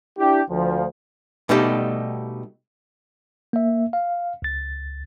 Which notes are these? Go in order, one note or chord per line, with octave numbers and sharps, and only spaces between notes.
D4 E4 G4
D2 F3
B2 G3 A3 D#4 G4
A#3 E5
F5
C#2 A6